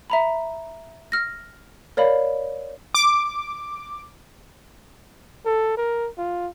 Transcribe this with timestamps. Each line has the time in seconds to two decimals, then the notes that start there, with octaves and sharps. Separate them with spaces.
0.10 E5 A#5 B5
1.12 E6 F6 A#6
1.97 A#4 C#5 D5 F5 B5
2.95 D6
5.46 A4
5.77 A#4
6.18 F4